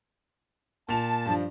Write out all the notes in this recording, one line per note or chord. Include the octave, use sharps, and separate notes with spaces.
A#2 A5 F7
G2 F3 D4